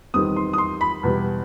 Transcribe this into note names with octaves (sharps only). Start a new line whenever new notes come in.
E2 D#3 G3 C4 D#6
C6
D#6
C6
B5
E2 B2 G3